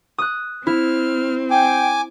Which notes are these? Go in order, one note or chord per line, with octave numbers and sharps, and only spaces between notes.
D#6 F#6
C4 E4 F6
G5 G#5 D6